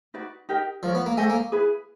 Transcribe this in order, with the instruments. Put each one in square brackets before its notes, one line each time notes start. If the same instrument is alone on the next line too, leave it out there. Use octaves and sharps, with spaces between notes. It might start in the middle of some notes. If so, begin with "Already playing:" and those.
[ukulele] D#4 F#4 B4 D5
D#4 G4 A#4 D#5
[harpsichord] F3 [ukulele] F4 A#4 C#5
[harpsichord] B3
A#3
[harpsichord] A3 [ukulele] A4 C5 D#5 G#5
[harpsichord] A#3
[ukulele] E4 G#4 B4